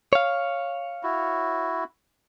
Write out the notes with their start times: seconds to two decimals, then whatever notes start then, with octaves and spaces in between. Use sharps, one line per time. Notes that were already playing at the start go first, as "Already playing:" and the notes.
0.13 C#5 F5
1.03 E4 F#4